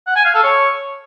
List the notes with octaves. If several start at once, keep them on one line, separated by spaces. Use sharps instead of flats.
F#5
G#5
F5
A4
C#5